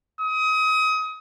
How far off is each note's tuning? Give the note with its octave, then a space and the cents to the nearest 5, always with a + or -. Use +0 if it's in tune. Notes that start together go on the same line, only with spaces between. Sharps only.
D#6 +30